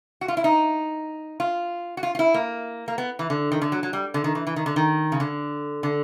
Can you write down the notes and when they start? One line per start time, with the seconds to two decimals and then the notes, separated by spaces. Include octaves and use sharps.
0.21 F#4
0.28 F4
0.37 E4
0.44 D#4
1.40 F4
1.97 F#4
2.03 F4
2.15 F4
2.19 E4
2.34 A#3
2.88 A#3
2.98 B3
3.19 E3
3.30 D3
3.52 D#3
3.62 D3
3.72 F#3
3.83 F#3
3.93 G3
4.14 D3
4.24 D#3
4.35 E3
4.47 E3
4.56 D#3
4.66 D3
4.76 D#3
5.12 C#3
5.20 D3
5.83 D3